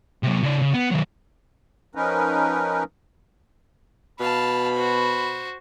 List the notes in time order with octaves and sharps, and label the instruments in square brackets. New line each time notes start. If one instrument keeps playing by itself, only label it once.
[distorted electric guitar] C3 F#3
C#3 D5
C#3
B3
D#3 F#3
[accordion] F3 C#4 D#4 A#4 B4
[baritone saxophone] B2 [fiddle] F5 A5 [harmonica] B5
[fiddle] F#4 C5